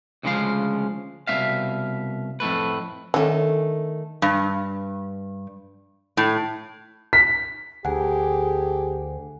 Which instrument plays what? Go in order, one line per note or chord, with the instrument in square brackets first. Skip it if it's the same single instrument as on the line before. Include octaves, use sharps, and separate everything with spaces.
[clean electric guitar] D2 A#2 C#3 F3 G#3 F5
C2 B2 F#3 C4 E5 F5
F2 A2 A3 B4
[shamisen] D3 C#4 [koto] D#3 A3
[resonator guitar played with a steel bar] G2
A2
[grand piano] B6
[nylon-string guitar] D2 [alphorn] G4 [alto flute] G#4 [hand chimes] F#5 G#5